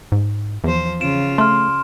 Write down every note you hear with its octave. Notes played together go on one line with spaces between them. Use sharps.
G#2
E2 F3 C5
C#3 F4 D7 E7
A3 C6 F6